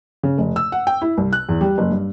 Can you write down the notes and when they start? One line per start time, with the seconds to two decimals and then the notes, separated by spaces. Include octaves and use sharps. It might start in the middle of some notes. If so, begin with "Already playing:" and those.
0.23 C#3
0.38 F1
0.56 E6
0.72 F#5
0.87 G5
1.02 E4
1.17 C2
1.33 F#6
1.49 E2
1.61 G3
1.78 F#1
1.91 G2